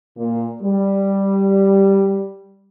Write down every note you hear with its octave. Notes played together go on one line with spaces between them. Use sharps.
A#2
G3